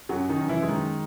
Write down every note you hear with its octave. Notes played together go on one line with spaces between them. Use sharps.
F#2 F#3 F#4
D#3 D#4
F#2
E3 E4
G#3
D#3 D#4